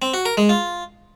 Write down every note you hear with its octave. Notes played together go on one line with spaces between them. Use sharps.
C4
F#4
A#4
G#3
F4